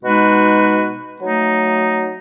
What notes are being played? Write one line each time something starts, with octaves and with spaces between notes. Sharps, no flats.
B2 G#3 D#4 F#4 B4
F#3 A3 D#4